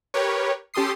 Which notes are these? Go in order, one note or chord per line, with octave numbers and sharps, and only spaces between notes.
G4 A#4 B4 C#5
C#4 G4 A4 C6 D#6 C7